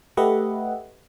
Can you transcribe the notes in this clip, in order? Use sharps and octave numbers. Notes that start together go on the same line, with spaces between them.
A3 G4 B4 D#5 E5 F#5